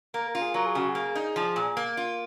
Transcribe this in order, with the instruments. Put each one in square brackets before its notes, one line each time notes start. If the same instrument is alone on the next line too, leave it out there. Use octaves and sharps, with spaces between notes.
[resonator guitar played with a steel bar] A#3 [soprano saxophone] A#4
[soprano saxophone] A#4
[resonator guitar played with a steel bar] F4
[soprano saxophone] G#4
[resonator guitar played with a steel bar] F#3 [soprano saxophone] A#4
[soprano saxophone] G#4
[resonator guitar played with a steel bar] C#3 [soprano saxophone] F#4
[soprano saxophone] G#4
[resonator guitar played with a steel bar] A#3
D#4
F3
A#2
A#3
F4